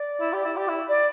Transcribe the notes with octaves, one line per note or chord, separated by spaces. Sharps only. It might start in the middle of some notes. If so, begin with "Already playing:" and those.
Already playing: D5
E4
G4
E4
G4
E4
D5